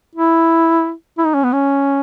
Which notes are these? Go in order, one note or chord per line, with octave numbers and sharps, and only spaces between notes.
E4
E4
D#4
C#4
B3
C#4